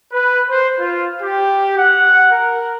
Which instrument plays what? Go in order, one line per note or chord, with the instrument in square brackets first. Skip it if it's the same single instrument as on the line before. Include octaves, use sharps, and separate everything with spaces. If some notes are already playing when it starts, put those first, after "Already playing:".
[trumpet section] B4
C5
F4
G4
F#5
A#4